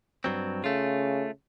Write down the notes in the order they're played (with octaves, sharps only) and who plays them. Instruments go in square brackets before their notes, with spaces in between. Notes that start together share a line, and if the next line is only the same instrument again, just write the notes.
[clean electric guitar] G2 F#3 C4
[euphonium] C#3 [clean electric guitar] A3 F4